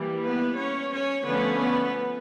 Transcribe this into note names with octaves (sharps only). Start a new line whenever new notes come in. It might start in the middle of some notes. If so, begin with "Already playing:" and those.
Already playing: E3 G3 A#3
B3 B4
C#4 C#5
C#4 C#5
D3 F3 A3 B3 C#4 B4
B3 B4